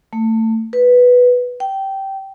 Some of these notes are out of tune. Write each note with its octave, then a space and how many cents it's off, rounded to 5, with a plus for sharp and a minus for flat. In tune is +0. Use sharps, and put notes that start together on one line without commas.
A3 +25
B4 +0
G5 -15